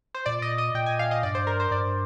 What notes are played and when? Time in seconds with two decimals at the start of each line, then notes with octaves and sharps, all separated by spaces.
0.15 C5
0.26 A#2 D5
0.42 D#5
0.58 D#5
0.74 A#2 G5
0.86 G#5
0.99 F5
1.11 D#5
1.23 G2 D5
1.35 C5
1.47 A#4
1.60 C5
1.71 G2 D5